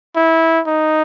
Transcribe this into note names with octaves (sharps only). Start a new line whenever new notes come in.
E4
D#4